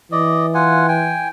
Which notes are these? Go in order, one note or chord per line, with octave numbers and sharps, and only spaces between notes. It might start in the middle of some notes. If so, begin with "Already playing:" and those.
E3 D5 D#5
F4 F#5 G#5
G5 G#5